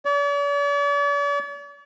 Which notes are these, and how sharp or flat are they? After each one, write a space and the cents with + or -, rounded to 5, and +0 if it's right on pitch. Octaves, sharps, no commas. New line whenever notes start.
D5 -45